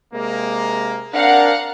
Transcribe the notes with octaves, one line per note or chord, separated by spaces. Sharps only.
C3 G#3 A#3
C4 D4 A#4 F5 F#5